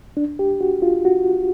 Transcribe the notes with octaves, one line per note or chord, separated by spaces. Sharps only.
D4
G4
F#4
F4
F#4